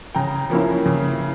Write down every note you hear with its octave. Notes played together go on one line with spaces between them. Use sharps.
C#3 G5 A#5
F3 A#3 C#4 E4
C#3